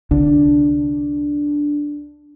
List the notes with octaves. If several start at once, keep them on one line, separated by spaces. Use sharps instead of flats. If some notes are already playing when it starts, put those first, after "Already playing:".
C2 D3 D4